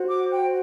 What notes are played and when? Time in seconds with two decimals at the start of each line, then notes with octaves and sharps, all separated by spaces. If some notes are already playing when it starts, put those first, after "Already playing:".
Already playing: F#4 C5
0.09 D6
0.31 G5